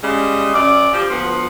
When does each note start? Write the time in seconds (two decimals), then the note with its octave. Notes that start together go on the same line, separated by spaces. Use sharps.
0.03 C#3 G3 G#3
0.53 F#2 D5
0.93 F3 G4
1.09 D2 F3 B3